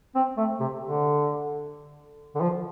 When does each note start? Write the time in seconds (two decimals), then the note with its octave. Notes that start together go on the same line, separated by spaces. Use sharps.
0.15 C4
0.37 A3
0.60 C3
0.82 D3
2.35 D3
2.41 F3